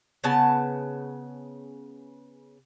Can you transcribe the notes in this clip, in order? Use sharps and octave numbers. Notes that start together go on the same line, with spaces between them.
C#3 B3 A5